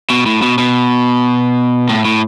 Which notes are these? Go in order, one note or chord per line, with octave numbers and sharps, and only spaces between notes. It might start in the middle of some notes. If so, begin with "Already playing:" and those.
B2
A2
B2
B2
A2
A2